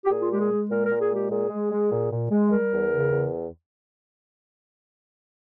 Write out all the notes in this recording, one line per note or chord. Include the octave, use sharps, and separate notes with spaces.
G4
A#2 G#4
F4
G#3 G4
G#4
G#3
A#2 A#4
A#2 A#4
G#4
G#3 G4
A#2 G#4
G#3
G#3
A#2
A#2
G#3
G3 A#4
E2
C#3
E2